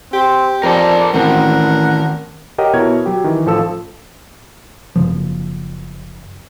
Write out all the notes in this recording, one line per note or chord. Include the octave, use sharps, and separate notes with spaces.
C4 G4
F2 A#4 C5 D5 A5
A1 D#3 C4 A#4 F#5
G4 A#4 C#5 D#5 F#5
B2 E4 A#4 C#5 A#5 G#6
F#3 G4
D#3 E3
A1 F3 A4 E6
F#1 C#3 F3